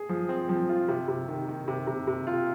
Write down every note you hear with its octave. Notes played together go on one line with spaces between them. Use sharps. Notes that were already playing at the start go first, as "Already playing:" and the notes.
Already playing: G#4
F3
C4
F3
F4
C3
C3
D#3
D#3
C3
C3
C3
F4